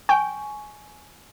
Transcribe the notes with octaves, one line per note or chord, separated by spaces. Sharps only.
G5 G#5 C#6